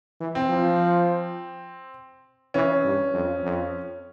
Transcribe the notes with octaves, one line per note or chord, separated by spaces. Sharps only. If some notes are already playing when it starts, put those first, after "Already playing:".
E3
C4
F3
E3 C#4
G2
F2
F2